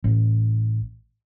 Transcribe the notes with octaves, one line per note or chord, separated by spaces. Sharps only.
A1